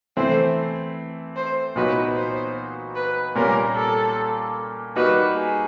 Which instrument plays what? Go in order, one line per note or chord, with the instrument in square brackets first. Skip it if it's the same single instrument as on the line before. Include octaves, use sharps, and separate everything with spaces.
[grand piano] E3 A3 C4 E4 [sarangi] C5
[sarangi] C5
[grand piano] A#2 F#3 B3 D#4 F#4 [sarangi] B4
[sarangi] C5
B4
[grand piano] A#2 G3 A#3 C#4 [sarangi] A#4
[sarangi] A4
[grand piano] G3 A#3 D#4 F#4 [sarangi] B4
[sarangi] G#4